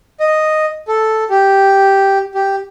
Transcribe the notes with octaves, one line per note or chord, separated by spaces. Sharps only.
D#5
A4
G4
G4